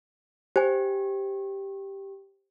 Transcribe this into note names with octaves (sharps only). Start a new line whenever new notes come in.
G4 C5 G#5